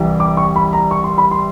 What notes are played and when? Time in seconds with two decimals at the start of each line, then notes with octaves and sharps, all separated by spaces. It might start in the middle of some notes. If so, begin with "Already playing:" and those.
Already playing: C2 C3 E3 G3
0.20 D6
0.37 C#6
0.56 B5
0.73 A#5
0.91 C#6
1.04 C6
1.18 B5
1.31 C6